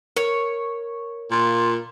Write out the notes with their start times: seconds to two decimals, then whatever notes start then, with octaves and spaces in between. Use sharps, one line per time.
0.17 A#4 C#5
1.31 A#2 F4